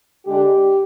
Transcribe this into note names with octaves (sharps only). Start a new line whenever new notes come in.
D3 G#3 D4 G4